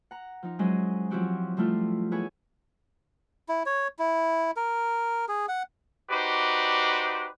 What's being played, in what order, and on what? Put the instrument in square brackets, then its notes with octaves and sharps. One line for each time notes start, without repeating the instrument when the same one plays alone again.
[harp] F#5 A#5
F3 D#4
F#3 G#3 C#4 E4 C5 D#5
F3 F#3 C4 E4 F#4 G4
F3 G3 A3 E4 F4
B3 E4 G#4 B4 C#5
[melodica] E4
C#5
E4
A#4
G#4
F#5
[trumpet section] D#4 F#4 G4 B4 C5 D5